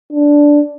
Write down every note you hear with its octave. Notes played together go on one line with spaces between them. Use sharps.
D4